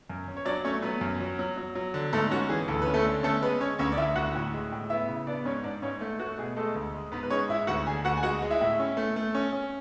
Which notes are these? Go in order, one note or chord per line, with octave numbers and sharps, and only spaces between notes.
F#2
C#4
C#5
F#3 D4 D5
A3 C#4 C#5
F#3 B3 B4
F#2
F#3
F#3
F#3
F#3
D3
G#2 A3 A4
C#4 F#4
E3 G#4
D2 A4
C#4 B4
A3 A4
D3
A3 C#4 A4
G#3 B3 B4
C#4 C#5
D2 C#4 C#5
D5
D2 E4 E5
D2 F#4 F#5
A2
G#3
A2
B3 E4 E5
C#3
B3 D4 D5
G#2 C#4 C#5
G#2 D4 D5
G#2 C#4 C#5
A3
A3 F#4
B2 G#4
G#3 A3 A4
D2
G#3
G#2 B3 B4
B4
G#3 C#4 C#5
G#2 E4 E5
D2 F#4 F#5
D3 G#4 G#5
D2 F#4 F#5
G#5
G#3 F#4 F#5
G#3
E4 E5
A2
C#4
A3
A3
C#4
C#4